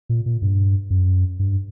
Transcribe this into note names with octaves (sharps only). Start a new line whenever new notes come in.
A#2
A#2
G2
F#2
G2